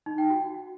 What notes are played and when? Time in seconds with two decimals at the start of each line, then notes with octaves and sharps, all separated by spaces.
0.06 D#4
0.18 G5
0.30 F#4